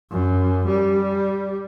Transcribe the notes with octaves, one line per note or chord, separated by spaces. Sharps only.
F#2
G3